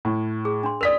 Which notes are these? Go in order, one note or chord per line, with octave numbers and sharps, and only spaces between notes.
A2
G#4
D4 C6
A#4 D5 D#6 B6 F7